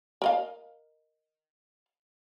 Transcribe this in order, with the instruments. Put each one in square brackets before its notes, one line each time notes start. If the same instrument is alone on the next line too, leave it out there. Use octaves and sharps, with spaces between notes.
[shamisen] A#4 D#5 F5